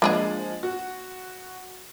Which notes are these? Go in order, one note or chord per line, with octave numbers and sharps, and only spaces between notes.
F3 G#3 A#3 D4 G#4
F#4